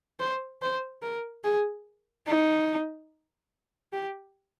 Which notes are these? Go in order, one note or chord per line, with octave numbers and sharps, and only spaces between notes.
C5
C5
A#4
G#4
D#4
G4